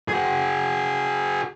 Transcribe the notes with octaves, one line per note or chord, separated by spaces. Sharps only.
F#4 G#4